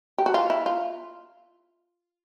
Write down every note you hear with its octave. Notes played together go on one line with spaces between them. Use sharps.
G4
F#4
F4
E4
F4